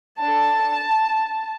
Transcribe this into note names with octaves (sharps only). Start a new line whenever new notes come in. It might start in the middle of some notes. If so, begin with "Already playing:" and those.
D4 A4 A5